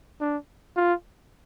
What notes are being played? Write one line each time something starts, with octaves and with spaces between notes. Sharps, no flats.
D4
F4